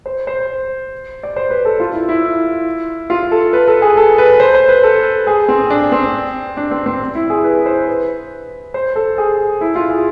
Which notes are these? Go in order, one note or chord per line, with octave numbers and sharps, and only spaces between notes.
C5
C5
D5
C5
B4
A4
F4
E4
E4
F4
A4
B4
A4
G#4
A4
B4
C5
C5
B4
A4
G#4
C4
D4
C4
D4
C4
C4
E4
G#4
B4
C5
B4
C5
A4
G#4
E4
F4
G#4